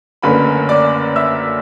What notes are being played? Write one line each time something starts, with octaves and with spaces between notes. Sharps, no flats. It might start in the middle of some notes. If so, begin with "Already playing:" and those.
F#1 F#2 D3 A3 B4 B5
D5 D6
E5 E6